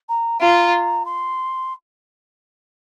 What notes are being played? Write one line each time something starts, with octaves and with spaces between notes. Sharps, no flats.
A#5
F4 A#5
C6